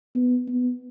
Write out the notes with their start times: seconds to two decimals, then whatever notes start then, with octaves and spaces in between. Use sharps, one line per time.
0.15 B3
0.48 B3